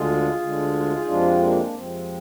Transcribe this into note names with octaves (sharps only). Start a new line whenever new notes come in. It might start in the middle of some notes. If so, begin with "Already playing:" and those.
Already playing: D2 D3 G#3 F4 G#4
D2 D3 G#3
D#4
F2 C3 F3 G#3 D4 F4
A#3 D4
F2 C3 F3 G#3 C4